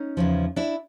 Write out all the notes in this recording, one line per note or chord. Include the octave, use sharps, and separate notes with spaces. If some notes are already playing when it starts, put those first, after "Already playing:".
Already playing: C#4 D#4
E2 C#3 F3
D4 E4